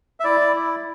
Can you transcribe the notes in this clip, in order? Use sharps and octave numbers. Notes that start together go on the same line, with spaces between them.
E5
E4 D5
E4